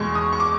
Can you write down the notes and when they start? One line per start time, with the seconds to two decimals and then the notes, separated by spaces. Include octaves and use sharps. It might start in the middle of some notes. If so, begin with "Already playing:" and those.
Already playing: E2 B2 G#3 C#6
0.15 D#6
0.32 C#6
0.40 D6